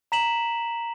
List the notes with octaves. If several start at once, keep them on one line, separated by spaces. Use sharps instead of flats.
A#5 B6 E7 F#7